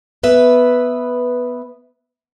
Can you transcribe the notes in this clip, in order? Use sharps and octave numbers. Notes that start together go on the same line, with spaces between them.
B3 B4 E5